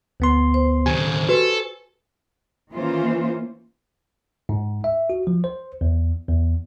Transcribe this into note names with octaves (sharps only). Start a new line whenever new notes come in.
D2 B3 C6
C5
D#2 A2 G4 G#5
F#4 G4 A4 B4
D#3 E3 A#3 C#4 F4 C5
G#2
E5
F#4
F3
C5
E2
E2